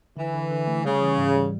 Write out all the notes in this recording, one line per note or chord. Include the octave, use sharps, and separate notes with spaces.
D3 E3
D3
D3
A3
C#3 G3
E3
G#2
G3